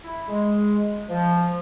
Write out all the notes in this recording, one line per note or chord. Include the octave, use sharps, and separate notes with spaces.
E4
G#3
F3